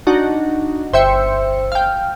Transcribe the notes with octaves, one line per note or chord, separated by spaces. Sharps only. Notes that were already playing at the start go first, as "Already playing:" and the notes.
D4 D#4 F#4
G1 C5 E5 G5 C#7
F5 G5